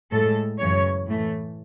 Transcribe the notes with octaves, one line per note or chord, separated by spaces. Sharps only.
A2 G#3 A4
F#2 C#3 E3 C#5
A2 E3 A3